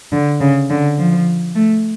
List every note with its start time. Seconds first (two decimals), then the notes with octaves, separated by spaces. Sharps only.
0.12 D3
0.40 C#3
0.70 D3
0.99 F3
1.56 A3